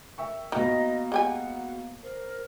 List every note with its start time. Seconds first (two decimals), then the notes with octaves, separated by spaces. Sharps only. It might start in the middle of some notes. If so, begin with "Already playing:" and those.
0.18 A#4 E5 G5 C#6 E6
0.52 B2 D#3 A#3 B3 D#5 F5 A#5
1.12 G#3 G4 F#5 G#5
2.03 A#4 C5